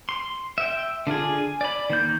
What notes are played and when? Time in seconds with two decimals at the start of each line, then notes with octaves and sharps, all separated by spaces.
0.09 C6
0.58 E5 G5
1.07 D3 D4 F4 G#4
1.38 G#5
1.61 D5 B5
1.90 D#3 A#3 G6